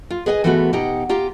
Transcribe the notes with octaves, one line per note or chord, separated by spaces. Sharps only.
F4
G#4 B4 D#5 F#5 G#5
E3 G#3 A3 B3 F4 F#4
B2 D#4 G4 F#5 A#5
F4 G4 A#5